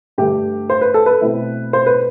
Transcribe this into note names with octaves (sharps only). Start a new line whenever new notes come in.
G2 D3 A3 G4
C5
B4
A4
B4
B2 A3 C4 E4
C5
B4